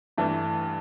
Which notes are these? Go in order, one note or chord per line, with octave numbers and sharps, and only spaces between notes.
G2 E3 A3 D4